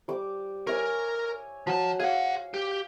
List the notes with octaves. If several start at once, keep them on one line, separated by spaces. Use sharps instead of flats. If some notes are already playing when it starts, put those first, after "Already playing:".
G3 D6
A#4 C#5 E5 G#5
F3 F#3 A5
G#4 F5 F#5
G4